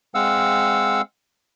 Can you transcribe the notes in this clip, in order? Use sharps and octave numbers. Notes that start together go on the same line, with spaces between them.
G#3 C4 F5 F#5 E6